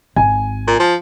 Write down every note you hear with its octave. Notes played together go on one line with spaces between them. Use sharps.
G#1 G#5
A#2
F3